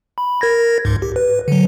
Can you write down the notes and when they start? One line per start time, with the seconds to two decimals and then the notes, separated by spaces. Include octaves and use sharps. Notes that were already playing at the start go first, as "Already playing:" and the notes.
0.18 B5
0.41 A#4 G#6 A#6
0.85 C#2 G#2
1.02 G4
1.16 B4
1.48 D3 F#3